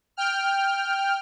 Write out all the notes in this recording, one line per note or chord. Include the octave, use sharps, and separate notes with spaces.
G5 F6